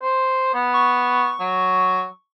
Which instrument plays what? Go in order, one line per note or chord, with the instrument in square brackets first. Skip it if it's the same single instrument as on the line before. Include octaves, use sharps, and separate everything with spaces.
[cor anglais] C5
B3
[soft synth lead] C#6
[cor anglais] F#3